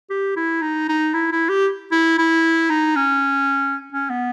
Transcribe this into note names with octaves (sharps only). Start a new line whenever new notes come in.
G4
E4
D#4
D#4
E4
E4
G4
E4
E4
D#4
C#4
C#4
B3